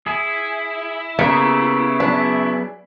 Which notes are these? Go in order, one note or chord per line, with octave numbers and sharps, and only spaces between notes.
E4 G#4 G#5
C#3 A#3 B3 G4 G#4
F#3 B3 D4 G#4